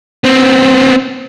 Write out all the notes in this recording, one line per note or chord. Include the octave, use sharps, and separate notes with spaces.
B3 C4